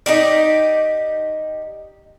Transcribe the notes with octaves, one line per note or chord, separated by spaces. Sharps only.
D#4 G4 D5